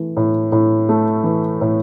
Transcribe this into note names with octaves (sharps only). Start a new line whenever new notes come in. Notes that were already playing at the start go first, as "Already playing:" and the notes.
Already playing: E3 A3
A2
A2
A3
E3
A2